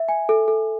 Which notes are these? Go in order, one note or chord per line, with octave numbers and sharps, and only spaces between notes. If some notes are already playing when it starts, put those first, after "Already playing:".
Already playing: E5
G#5
A4
A4